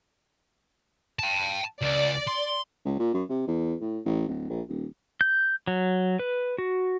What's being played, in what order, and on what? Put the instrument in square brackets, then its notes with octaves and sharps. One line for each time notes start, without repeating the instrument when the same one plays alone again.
[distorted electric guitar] G5 A5
[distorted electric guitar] C#2 [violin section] D5
[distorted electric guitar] C6
[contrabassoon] C#2
A#2
F#2
C3
E2
A2
A1
D1
A#1
D#1
[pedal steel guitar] G6
F#3
B4
F#4